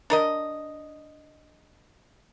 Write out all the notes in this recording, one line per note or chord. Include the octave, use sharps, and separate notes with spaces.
D4 A#4 D#5